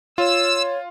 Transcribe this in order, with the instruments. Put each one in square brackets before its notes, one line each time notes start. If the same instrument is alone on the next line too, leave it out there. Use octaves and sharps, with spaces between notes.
[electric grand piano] F4 [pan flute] C#5 [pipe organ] E6